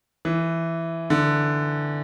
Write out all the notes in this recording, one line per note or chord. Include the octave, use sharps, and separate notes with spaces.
E3
D3